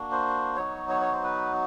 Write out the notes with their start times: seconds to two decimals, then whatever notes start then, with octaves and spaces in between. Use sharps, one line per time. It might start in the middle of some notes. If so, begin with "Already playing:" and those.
Already playing: A#3 D4 F#4
0.12 C5
0.56 F#3 B3 D#4 F#4 C#5
0.89 C#5
1.01 C#5
1.12 C5
1.23 B4